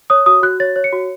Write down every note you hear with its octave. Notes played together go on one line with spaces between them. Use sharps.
C#5 D#6
F#4 D#6
F#4 F#6
C#5 A6
C#5
C#7
F#4